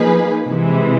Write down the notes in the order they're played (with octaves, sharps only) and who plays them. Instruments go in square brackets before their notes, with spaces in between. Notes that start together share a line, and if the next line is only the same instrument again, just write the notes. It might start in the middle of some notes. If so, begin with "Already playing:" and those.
Already playing: [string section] F3 A#3 D#4 G#4 B4
C3 E3 G#3